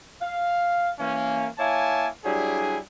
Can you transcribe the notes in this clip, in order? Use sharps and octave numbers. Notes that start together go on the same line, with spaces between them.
F5
E3 A#3 C#4
A#3 E4 C#5 F5 G#5 A5
F#3 G3 D4 E4 G#4